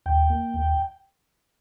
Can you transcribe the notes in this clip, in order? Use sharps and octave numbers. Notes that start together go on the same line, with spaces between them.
D#2 G5
A#3
D#2